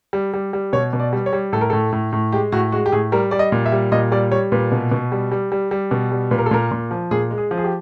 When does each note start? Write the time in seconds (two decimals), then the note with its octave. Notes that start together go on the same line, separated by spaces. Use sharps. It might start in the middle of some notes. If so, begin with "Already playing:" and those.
0.13 G3
0.34 G3
0.53 G3
0.73 B2 C#5
0.93 B2
0.99 D5
1.13 G3
1.26 C#5
1.33 G3
1.53 A2 A4
1.61 A#4
1.70 A2 A4
1.93 A2
2.13 A2
2.32 G#3 G4
2.52 A2 F#4
2.72 G#3 F#4
2.86 G4
2.92 A2 G#4
3.12 G3 A#4
3.31 G3 D5
3.39 D#5
3.52 A#2
3.66 E5
3.72 G3
3.92 A#2 D#5
4.12 G3 D5
4.32 G3 C#5
4.52 A#2 B4
4.72 B2
4.91 B2
5.12 G3
5.32 G3
5.52 G3
5.71 G3
5.91 B2
6.11 G3
6.31 A#2 B4
6.38 A#4
6.46 A4
6.51 A#2 A#4
6.71 A#2
6.91 F3
7.11 A#2 G#4
7.31 G#3
7.38 G#4
7.51 F3
7.58 G#4
7.64 G4